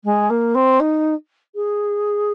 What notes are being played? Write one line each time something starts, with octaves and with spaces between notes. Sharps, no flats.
G#3
A#3
C4
D#4
G#4